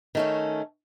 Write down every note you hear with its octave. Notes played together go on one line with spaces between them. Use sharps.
D#3 A3 C#4